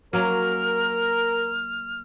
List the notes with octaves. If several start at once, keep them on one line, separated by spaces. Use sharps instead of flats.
F#3 A#3 C#4 A#4 F6